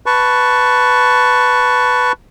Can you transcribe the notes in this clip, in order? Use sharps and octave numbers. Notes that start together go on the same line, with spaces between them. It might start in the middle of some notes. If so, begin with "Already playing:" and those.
B4 A5 C#6